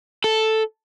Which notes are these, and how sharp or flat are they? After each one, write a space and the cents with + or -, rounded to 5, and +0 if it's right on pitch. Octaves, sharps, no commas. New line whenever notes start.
A4 +0